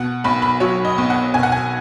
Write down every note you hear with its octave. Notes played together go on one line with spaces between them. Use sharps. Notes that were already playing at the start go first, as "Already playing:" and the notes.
Already playing: B2 F#5
B1 B5
B5
F#3 C#5
D#5
B1
F#5
B2 G#5
F#5
G#5